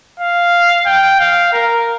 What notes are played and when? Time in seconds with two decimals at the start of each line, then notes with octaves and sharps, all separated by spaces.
0.20 F5
0.87 G5
1.20 F5
1.53 A#4